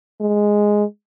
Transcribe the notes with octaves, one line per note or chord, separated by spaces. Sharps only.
G#3